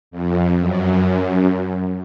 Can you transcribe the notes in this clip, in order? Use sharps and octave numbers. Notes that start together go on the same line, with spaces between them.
F2
F#2